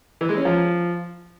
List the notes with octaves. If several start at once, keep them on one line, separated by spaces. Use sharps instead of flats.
E3
G#3
C#4
F3